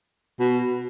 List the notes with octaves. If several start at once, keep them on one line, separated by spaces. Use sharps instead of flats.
B2